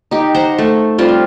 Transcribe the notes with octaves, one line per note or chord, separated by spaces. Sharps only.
D#4 G4
C5 F#5 A#5
A3
G3 C4 F4